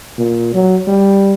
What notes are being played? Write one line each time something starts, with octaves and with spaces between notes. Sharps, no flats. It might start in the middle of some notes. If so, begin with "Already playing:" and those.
A#2
F#3
G3